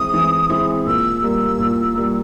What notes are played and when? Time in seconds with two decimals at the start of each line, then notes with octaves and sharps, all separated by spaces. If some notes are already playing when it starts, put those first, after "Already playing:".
Already playing: E3 G#3 C4 E4 D#6
0.14 E3
0.50 G#3 C4 E4
0.86 A#2 E6
1.23 G3 A#3
1.59 A#2
1.95 G3 A#3